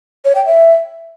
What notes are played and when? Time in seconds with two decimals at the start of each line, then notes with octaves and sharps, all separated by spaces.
0.25 C#5
0.35 G5
0.46 E5